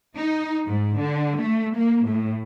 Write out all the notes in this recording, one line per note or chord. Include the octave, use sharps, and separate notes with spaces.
D#4
G#2
D3
A3
A#3
A2